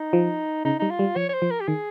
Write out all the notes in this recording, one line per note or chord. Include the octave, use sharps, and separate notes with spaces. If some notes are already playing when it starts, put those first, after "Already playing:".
Already playing: D#4
F3
C#3 D#4
G3 D#4
F4
G3
F3 C#5
C#5
C5
F3
A#4
G4
D#3 G#4